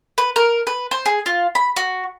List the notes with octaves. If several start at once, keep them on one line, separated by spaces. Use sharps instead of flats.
B4
A#4
B4
C5
G#4
F4
B5
F#4